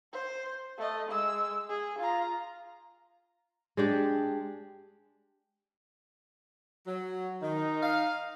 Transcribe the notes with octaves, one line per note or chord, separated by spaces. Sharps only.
C5
A3 D#5
G#3 E6
G#4
F4 A#5
G#3 D4 G4
F#3
D#3 D#4
F5